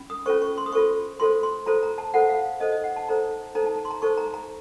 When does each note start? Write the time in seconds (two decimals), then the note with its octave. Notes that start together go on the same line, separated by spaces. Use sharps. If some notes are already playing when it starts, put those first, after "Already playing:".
Already playing: C#4 F4
0.10 D#6
0.26 C#4 F4 A4 C5 C#6
0.42 C#6
0.58 C6
0.66 D#6
0.73 F4 A4 C5 C#6
1.20 F4 A4 C5 C6
1.43 C6
1.66 F4 A4 C5 A#5
1.83 A#5
1.98 A5
2.14 F4 A4 C5 F#5
2.29 F5
2.60 D#4 A4 C5 D#5
2.72 D#5
2.84 F#5
2.96 A5
3.09 D#4 A4 C5 A#5
3.55 D#4 A4 C5 A#5
3.66 A5
3.78 A5
3.85 C6
3.91 A#5
4.02 D#4 A4 C5 C#6
4.17 A#5
4.34 A#5